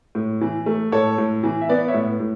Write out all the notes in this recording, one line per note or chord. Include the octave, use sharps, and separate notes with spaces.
A2
E3
A3
A2 A4 C#5
A2
E3
E5
B3 B4 D5
C#5 E5
A2
A2